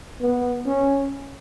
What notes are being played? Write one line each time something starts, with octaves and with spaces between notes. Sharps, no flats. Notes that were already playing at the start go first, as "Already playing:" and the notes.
B3
C#4